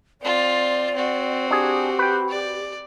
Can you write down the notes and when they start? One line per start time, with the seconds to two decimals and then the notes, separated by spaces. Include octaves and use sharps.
0.21 C4 F4 D5
0.95 C4 F#4
1.51 D4 G4 G#4
1.99 B4 G5
2.29 D5